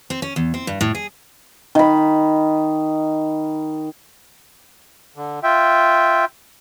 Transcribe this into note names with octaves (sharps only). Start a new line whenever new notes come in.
C4
C#4
E2
C4
G2
A2
G#4
D#3 B5
D3
F4 E5 G5